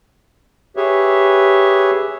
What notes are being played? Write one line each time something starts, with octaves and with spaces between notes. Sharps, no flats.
G4 G#4 B4 C#5 E5